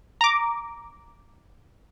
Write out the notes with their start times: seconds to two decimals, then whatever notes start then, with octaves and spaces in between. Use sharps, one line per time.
0.21 A#5 D6